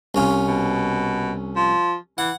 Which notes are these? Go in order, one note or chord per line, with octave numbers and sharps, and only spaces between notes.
C2 C#4 F4
B2
F3
E3 F#5